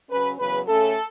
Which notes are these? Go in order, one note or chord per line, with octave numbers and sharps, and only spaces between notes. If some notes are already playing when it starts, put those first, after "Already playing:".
C#3 F#3 C#4 B4
E2 C#3 F#3 B4
C#3 A3 C#4 A4